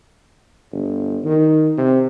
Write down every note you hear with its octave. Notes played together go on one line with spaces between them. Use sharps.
G1
D#3
C3